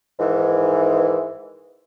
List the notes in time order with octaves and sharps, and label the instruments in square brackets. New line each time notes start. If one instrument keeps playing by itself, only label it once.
[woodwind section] G#2 D#3 E3